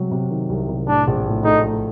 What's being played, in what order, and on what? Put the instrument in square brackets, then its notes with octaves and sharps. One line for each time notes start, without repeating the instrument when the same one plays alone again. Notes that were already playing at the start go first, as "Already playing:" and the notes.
Already playing: [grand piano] C3 F#3
C3
D#3
C2
C3
[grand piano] A2 [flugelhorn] D4
[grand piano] A#1
A2
[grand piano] A3 [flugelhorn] D#4
[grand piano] A3